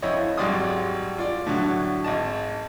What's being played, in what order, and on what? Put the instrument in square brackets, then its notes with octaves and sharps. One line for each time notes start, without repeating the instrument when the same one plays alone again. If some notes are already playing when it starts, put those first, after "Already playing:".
[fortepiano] F2 E4 C#5 D#5
G#1 F#3 G3 D5 C6 D#6
F4 D5
A2 D3 F#3
G#1 D#5 A5